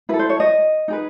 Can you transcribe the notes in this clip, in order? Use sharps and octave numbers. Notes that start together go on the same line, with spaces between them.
E4 A4 B4
C5
C#5
D#5
D#4 G#4 B4